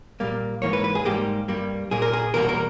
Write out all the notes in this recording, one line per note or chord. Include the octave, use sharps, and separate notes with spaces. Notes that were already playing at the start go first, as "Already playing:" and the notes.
A#2 G3 A#3
G#2 E3 A#3 C#5
B4
B4
G#4
G#2 G3 A#3 G4
G2 G3 A#3
A#2 A#3 G#4
A#4
G#4
E2 B2 G3 A#3 A#4
A#4